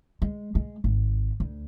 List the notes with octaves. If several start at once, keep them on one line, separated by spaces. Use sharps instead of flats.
G#3
G#3
G#1
D2